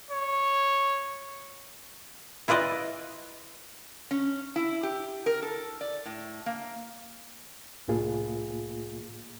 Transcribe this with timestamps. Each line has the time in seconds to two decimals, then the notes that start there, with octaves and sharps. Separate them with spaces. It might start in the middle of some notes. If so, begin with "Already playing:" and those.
0.10 C#5
2.48 E4 F4 B4 D5 D#5
4.11 C#4
4.56 E4
4.83 G4
5.26 A#4
5.42 A4
5.81 D5
6.06 A2
6.46 A#3
7.88 C2 A2 A#3 F4 G#4